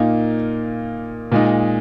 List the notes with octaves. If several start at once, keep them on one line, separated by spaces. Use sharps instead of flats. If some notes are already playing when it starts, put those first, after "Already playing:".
Already playing: A#2 A#3 D#4
A#2 G#3 D#4